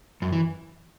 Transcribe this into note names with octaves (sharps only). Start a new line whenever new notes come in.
F#2
E3